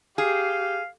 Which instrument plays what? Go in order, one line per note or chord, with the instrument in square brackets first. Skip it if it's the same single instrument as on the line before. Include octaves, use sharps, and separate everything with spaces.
[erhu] G4 [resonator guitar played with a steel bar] G#4 [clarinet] F5